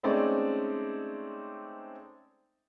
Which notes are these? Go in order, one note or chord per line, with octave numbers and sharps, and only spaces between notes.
G#3 A3 C4 C#4 D#4 D5